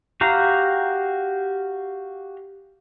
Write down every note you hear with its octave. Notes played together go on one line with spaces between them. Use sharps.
F#4 G4 F5 A#5